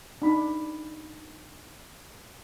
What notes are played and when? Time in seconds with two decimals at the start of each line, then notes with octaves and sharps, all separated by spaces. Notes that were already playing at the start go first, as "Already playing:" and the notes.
0.22 D4 D#4 B5